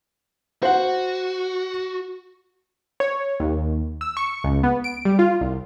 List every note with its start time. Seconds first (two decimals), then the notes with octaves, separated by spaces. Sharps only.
0.63 F#4 C5 F#5
3.00 C#5
3.40 D#2
4.01 E6
4.17 C#6
4.44 C#2
4.63 B3
4.84 D7
5.05 G3
5.19 F4
5.41 C2